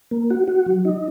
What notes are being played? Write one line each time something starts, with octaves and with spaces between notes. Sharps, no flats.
A#3
F#4
F#4
F#3
D#4